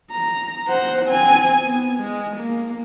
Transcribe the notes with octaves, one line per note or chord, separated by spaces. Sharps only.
A#5
C5 F#5
C4 G#5
B3
G#3
A#3